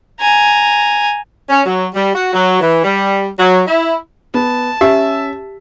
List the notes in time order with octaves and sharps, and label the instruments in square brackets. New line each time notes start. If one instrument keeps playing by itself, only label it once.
[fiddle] G#5 A#5
[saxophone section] C#4
F#3
G3
F#4
F#3
E3
G3
F#3
E4
[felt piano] B3 [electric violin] A5
[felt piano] C#4 [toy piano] G4 [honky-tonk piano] E5